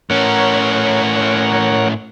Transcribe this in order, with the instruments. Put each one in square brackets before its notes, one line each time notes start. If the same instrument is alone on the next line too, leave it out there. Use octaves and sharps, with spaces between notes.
[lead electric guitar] A2 C#4 [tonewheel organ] A#4 C#5 F#5